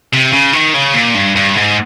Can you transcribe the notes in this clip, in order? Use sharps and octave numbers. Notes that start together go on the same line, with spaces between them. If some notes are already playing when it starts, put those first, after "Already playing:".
C3
C#3
D#3
C#3
A#2
G2
G2
G#2